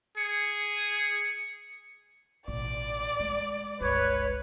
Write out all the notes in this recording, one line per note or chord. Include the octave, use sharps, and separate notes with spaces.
G#4 C#7
A1 B2 D5
G#3
G1 C#2 B4 C#5